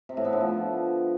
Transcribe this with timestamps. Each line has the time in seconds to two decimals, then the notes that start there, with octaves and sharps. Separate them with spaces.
0.09 C3
0.17 A2
0.25 B3
0.33 D3
0.40 F3